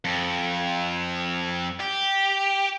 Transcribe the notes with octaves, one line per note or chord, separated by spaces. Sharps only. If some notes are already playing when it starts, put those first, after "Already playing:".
F2
G4